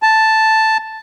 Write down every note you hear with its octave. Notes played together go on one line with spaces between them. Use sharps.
A5